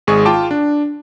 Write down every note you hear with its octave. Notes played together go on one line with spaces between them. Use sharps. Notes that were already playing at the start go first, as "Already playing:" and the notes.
G#1 G#3 G#4 C#6
F4 G5 A5 D6
D4